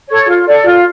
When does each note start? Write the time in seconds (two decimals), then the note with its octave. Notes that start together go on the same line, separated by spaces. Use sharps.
0.09 A4 C#5
0.28 F4
0.46 A4 D5
0.64 F4